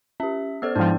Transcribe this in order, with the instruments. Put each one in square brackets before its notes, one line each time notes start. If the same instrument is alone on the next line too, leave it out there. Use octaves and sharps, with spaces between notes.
[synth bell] C#4 G4 [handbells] E5
[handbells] B3 D5 [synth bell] A4 C5 E6
[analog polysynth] G#2 F3 [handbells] D4 [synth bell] E4 G5